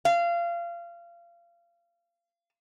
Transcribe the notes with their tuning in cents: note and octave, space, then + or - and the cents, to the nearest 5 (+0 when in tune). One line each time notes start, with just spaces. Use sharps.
F5 -25